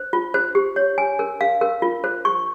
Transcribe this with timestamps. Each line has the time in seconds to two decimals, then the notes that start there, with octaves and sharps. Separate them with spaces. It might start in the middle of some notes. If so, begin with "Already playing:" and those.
Already playing: C5
0.13 F4
0.34 C5
0.55 G4
0.76 C#5
0.98 G#5
1.19 A#4
1.41 F5
1.61 A#4
1.82 F4
2.04 C5
2.25 C#6